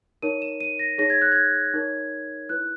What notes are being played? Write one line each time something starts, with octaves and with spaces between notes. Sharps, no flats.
D#4 A#4 C#5 D#7
E7
D#7
A#6
D#4 G#4 C#5 A#6
G#6
F#6
G#6
D#4 A#4 C#5
E4 B4 F#6